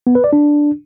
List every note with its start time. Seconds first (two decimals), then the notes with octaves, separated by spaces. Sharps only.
0.07 B3
0.15 B4
0.24 D5
0.33 D4